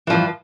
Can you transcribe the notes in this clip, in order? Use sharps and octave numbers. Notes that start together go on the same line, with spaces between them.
G2 E3 F3